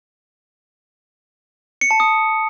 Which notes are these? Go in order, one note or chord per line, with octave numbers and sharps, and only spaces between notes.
C#7
A5
D#6